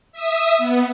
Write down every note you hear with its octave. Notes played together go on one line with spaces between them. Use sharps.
E5 D#6
B3